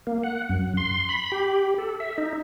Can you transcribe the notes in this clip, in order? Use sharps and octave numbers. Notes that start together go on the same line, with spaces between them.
A#3
F#5
F#2
C6
B5
G4
A4
E5
D#4